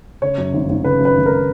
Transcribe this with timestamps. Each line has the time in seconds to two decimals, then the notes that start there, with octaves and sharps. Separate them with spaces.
0.22 C#3 C#5
0.38 F#2
0.53 G#1
0.69 G#1
0.84 C#3 B4
0.99 F#2
1.05 B4
1.15 G#1
1.26 A#4